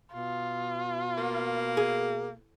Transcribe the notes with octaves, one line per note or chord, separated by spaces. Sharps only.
B2 F4
A#3
G#4